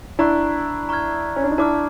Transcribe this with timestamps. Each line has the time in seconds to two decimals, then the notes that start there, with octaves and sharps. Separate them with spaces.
0.19 D4 E4 A#5 C#6 F#6
0.89 A#5 C#6 F6 G#6
1.36 C#4
1.44 D4
1.51 D#4
1.58 D4 E4 A5 D6 F6